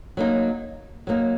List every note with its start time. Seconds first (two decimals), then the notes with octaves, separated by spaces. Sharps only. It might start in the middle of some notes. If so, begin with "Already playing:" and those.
0.17 F#3 A#3 D#4
1.07 F#3 A#3 D#4